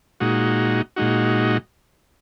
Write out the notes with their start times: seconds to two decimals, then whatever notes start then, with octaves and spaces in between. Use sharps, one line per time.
0.20 A#2 G#3 D#4 F#4
0.96 A#2 G#3 D#4 F#4